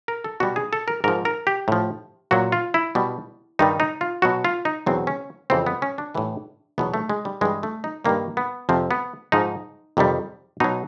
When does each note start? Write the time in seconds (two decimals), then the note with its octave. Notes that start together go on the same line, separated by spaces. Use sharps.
0.08 A#4
0.24 A4
0.40 B2 G3 F#4
0.56 G#4
0.73 A4
0.88 A#4
1.04 G#2 F3 A#4
1.25 A#4
1.47 G4
1.68 A2 F3
2.31 A#2 F#3 F#4
2.52 F4
2.74 E4
2.95 B2 G3
3.59 G2 D#3 G3 D#4
3.80 D#4
4.01 F4
4.22 B2 F#3 F#4
4.45 F4
4.65 D#4
4.86 E2 B2 F#3 C4
5.07 C#4
5.50 F2 C#3 E3 G3 C4
5.66 B3
5.82 C#4
5.98 D4
6.15 A2 E3 G3
6.78 E2 B2 F#3 B3
6.94 A3
7.09 G#3
7.25 G3
7.41 G2 E3 G3 G#3
7.63 A3
7.84 D#4
8.05 G2 D#3 G3 A#3
8.37 B3
8.69 F2 C3 F3 C4
8.91 B3
9.32 G#2 F3 D#4
9.97 F2 C3 D#3 G3
10.60 B2 F#3 D#4